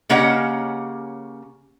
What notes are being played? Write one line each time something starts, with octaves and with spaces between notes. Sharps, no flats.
C#3 A#3 C#4 G4 D#5 F#5